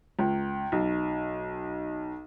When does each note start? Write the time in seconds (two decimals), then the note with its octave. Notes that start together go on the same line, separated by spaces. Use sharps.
0.19 C#2
0.72 B1